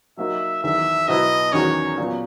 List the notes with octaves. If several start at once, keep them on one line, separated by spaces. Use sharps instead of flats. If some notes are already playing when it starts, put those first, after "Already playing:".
F#3 A#3 D#4 F#4 E5
E2 D#3 F#3 E5
B2 F#3 B3 E4 B4 D#5
E2 D#3 F#3 C#4 F#4 C#5
A#2 F#3 B3